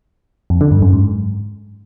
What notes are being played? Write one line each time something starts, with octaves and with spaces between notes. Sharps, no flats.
F2
D3
G2
F#2
G#2